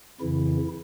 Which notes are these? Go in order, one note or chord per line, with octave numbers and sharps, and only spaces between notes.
F2 C#3 E3 E4